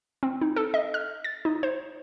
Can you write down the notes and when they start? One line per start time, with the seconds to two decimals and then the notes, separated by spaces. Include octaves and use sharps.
0.23 C4
0.41 D#4
0.56 A4
0.74 D#5
0.94 F6
1.24 A6
1.45 D#4
1.63 C5